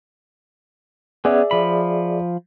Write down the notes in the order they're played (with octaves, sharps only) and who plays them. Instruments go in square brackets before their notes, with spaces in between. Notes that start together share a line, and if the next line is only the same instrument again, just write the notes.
[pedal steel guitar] B3 C#4 [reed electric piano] G#4 D5 E5
[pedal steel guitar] F3 B5